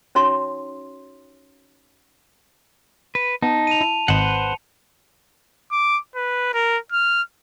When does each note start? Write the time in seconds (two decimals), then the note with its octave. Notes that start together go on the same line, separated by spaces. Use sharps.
0.15 C#4 D#4 F#4 C#5 E5 C6
3.15 B4
3.42 B3 D#4 A5
3.67 D#7 F7
3.81 E4
4.08 G#1 B4 C5 D#5 F#5 C#7
5.72 D6
6.15 B4
6.54 A#4
6.92 F6